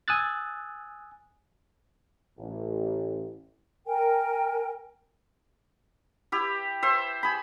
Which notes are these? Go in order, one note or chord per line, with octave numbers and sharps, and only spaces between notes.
G#5 D#6 E6 F#6 A6
A1
A#4 G5 G#5
E4 G4
C5 E5
G#4 B5